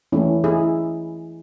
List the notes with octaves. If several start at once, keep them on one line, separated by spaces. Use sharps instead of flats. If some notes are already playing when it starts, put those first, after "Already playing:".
E3 A3 C#4 E4
E4 G#4